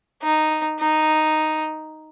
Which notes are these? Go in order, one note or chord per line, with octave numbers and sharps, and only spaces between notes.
D#4
D#4